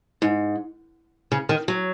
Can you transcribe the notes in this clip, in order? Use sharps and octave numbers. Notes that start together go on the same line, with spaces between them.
G#2
C#3
D#3
F#3